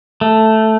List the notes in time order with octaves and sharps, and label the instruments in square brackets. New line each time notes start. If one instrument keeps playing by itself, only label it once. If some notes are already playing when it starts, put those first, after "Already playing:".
[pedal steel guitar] A3